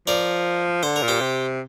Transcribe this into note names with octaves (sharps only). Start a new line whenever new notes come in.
F3 A#4 D5
D3 C5
A#4
A#2
G4 C5
C3